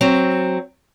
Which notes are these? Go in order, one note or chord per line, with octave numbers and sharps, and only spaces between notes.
F#3 C4